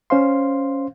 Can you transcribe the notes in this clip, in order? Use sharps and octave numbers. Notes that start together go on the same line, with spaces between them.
C#4 C5 F5 C6